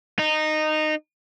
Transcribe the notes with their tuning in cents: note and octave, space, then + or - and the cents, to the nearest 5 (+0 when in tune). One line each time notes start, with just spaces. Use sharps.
D#4 -15